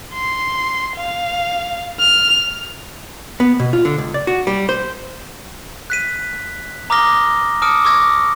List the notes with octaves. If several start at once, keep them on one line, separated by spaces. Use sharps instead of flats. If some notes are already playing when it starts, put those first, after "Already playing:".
C6
F5
F6
B3
B2
F4
D3
C#2
D5
F#4
G3
C5
F#6 B6 D#7
A#5 D6 D#6 F6 A#6 G7
A5 D6 D#6 F6 C#7 D7
C#6 D6 E6 G#6 A#6